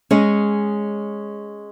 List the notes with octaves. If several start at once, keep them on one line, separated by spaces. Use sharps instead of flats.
G#3 C#4 G#4 D#5